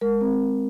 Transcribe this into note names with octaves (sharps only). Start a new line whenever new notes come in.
G#3 A#4
C4